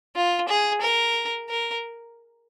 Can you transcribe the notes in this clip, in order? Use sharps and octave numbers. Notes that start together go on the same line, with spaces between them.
F4
G#4
A#4
A#4